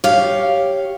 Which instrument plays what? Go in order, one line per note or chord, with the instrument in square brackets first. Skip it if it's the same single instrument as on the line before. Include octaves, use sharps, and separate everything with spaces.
[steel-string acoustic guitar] G4 C#5 F5